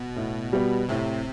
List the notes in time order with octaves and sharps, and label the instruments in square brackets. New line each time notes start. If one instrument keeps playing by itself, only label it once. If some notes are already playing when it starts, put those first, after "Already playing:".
Already playing: [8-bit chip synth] B2
[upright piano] A2
G3 B3 F#4
[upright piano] A2 [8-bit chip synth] C3